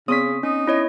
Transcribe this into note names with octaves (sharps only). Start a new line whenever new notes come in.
C#3 B3 C4 D#6 B6
C#4 D#4
E4 C#5 D#5